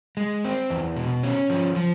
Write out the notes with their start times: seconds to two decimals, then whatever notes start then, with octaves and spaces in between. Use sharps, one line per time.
0.17 G#3
0.44 C4
0.70 E2
0.97 B2
1.23 C#4
1.50 F3
1.76 F3